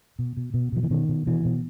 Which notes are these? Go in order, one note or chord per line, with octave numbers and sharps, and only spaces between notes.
B2
B2
B2
B2 F3
E3
B2 D#3
B2
B2 E3
B2